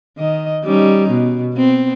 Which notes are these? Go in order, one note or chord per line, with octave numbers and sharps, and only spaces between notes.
D#3 D#5
G3 C#4 D#4
B2
B3 C4